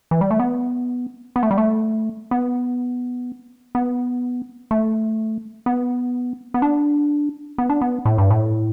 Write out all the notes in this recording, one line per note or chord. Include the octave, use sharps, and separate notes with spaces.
E3
G3
A3
B3
B3
A3
G3
A3
B3
B3
A3
B3
B3
D4
B3
D4
B3
A2
G2
A2